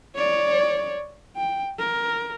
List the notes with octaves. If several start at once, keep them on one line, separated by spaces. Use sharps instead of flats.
C#5 D5
G5
A#4